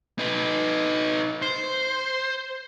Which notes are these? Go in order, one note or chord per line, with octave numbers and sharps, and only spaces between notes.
D#4 B4
C5